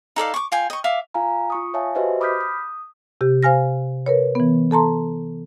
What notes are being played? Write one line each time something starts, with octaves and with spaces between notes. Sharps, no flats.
D#4 A4 D5 F5
C#6 D6
F4 G5 G#5
D#5 C#6
E5 F5 D6
F4 F5 G#5 A#5
F4 C#6 D#6
C#5 E5 F5 G#5 A5
F#4 G4 B4 C5 D#5 E5
B5 D6 D#6 F6 G6 B6
D#6
C3 G4
C5 F5 G#5 F6 A#6
A#4 B4 C#5
E3 B3
A4 A5 A#5 C6